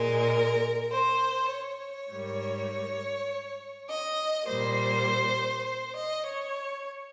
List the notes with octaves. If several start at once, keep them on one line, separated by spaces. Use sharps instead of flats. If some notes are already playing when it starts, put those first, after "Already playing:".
Already playing: A#2 G#3 A#4
C5
C#5
G#2 G3 A#3
D#5
A#2 G3 A#3 C5
C5
D#5
C#5